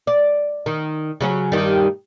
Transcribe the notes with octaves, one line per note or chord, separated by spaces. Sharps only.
D5
D#3
C#3 F#3 C#4
G2 D#3 G3